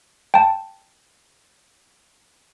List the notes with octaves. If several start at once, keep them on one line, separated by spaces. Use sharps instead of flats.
G5 A5